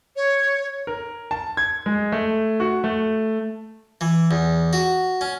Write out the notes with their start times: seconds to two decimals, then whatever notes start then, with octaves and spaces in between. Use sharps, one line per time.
0.16 C#5
0.87 A#4
1.31 A5
1.57 G#6
1.86 G#3
2.12 A3
2.60 F#4
2.84 A3
4.01 E3
4.31 E2
4.73 F#4
5.21 C#4